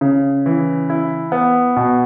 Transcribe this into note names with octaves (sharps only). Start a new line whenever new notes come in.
C#3
E3
E4
B3
B2